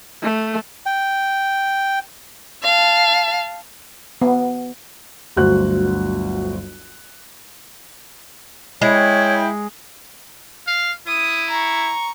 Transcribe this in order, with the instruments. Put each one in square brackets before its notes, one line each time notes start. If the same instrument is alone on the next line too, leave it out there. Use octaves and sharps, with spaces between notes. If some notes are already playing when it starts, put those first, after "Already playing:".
[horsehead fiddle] A3
[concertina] G5
[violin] F5 A5
[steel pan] B3
[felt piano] G1 D2 F#3 F#4 C5 F#6
[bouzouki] G#3 [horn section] E4 G5 [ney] C#5
[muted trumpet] F5
[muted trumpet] E4 [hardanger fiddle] D#6
[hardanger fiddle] A#5 C#6